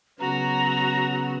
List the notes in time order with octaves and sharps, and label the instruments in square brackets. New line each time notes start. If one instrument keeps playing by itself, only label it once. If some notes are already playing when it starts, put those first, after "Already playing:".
[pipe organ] C#3 B3 [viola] F#3 F#4 [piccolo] A#5